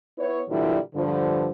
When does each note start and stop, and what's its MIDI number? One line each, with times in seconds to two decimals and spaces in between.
0.18 0.40 59
0.18 0.40 64
0.18 0.40 73
0.49 0.77 46
0.49 0.77 50
0.49 0.77 52
0.49 0.77 54
0.49 0.77 55
0.49 0.77 64
0.95 1.49 43
0.95 1.49 50
0.95 1.49 53